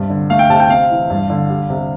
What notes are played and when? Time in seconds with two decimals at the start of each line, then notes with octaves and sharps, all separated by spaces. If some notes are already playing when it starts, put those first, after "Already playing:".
Already playing: G2 C3
0.10 D3
0.30 A3 F5
0.39 G5
0.50 C3 A5
0.60 G5
0.69 C4 F5
0.90 E3
1.10 G2
1.30 D3
1.50 G3
1.70 C3